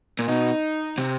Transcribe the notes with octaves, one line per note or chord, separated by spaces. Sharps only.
A#2
B2 D#4
C3